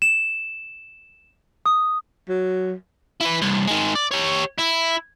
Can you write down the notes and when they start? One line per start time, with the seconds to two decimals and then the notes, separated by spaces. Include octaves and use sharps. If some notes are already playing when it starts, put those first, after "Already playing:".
0.02 E7
1.66 D#6
2.29 F#3
3.21 E4 B4
3.42 C2 G2
3.68 D#3 G#3
3.95 D5
4.11 G4 C#5
4.59 E4